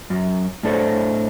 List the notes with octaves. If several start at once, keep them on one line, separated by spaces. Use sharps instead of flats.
F#2
A2 D4 A4 C5 C#5